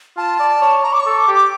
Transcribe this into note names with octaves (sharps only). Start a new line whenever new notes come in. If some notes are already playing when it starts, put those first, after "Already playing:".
F4 A5
D5
C#5
C#5 A#5
D6
C#6
A4
D6
G4
D6